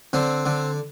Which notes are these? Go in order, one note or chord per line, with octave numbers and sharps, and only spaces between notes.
D3 C4
D3